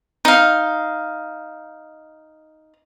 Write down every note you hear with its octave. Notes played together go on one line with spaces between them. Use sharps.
D#4 F5